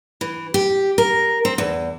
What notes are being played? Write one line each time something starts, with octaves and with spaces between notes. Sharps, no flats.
E3
G4
A#4
C4
E2